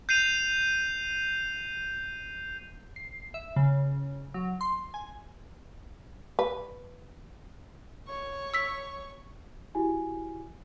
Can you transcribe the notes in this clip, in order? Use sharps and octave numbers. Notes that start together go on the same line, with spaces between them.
G6 C7 D#7 F7
C7
E5
C#3
F#3
C6
G#5
B4
C#5 C#6
E6 B6
E4 F#4 G4 G#5